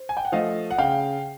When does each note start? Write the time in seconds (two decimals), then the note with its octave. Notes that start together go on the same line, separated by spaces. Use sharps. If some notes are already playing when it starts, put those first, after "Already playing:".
Already playing: C5
0.09 G#5
0.17 G5
0.25 F#5
0.32 F3 A3 D#5 F5
0.71 F#5
0.78 C#3 F5 G5